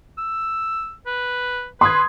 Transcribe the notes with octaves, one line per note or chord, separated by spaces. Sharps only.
E6
B4
B4 C6 D#6 G#6